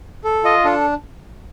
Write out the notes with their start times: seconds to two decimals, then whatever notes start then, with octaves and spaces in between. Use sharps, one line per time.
0.24 A4
0.44 F4 D#5
0.64 D4 A4